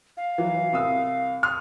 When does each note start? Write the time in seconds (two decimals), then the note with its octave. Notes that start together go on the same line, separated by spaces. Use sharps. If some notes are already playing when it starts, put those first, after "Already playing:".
0.17 F5
0.38 E3 F#3
0.73 C2 D#6 E6
1.43 C6 D#6 F6